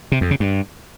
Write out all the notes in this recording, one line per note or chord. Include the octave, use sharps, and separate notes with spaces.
C3
F2
C#3
G2